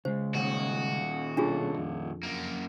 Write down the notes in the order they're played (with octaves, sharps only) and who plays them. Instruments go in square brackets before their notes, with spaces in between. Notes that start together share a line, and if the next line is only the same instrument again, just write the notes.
[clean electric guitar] C#3 G#3 [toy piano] C5
[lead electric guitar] A#2 D#3 [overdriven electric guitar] F#4
[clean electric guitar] B1 C#4 A4 [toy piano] D4 F4 G#4
[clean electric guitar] F2
[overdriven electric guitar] F#2 A#3